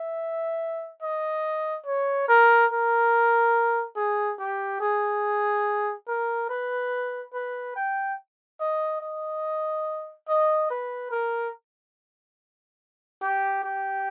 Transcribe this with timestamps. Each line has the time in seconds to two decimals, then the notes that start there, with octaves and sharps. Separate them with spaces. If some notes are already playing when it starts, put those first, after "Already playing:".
Already playing: E5
1.02 D#5
1.86 C#5
2.28 A#4
2.71 A#4
3.96 G#4
4.39 G4
4.80 G#4
6.08 A#4
6.49 B4
7.34 B4
7.76 G5
8.60 D#5
9.01 D#5
10.28 D#5
10.70 B4
11.11 A#4
13.22 G4
13.64 G4